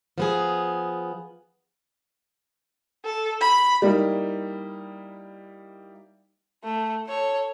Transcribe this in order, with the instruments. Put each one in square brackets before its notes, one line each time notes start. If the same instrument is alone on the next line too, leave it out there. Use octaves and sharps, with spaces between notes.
[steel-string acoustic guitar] F3 B3 G#4
[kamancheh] A4
B5
[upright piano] G3 A#3 D#4 E4
[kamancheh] A3
A4 C#5